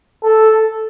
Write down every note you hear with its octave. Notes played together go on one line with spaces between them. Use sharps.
A4